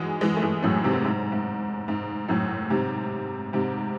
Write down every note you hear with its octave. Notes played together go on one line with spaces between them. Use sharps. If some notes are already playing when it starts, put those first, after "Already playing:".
Already playing: E3 F#3 G#3
E3 G#3
A3
E3 G#3
F#2 A2
G#2 C3
G#2
G#2
G#2
F#2 A2
G#2 C3
G#2 C3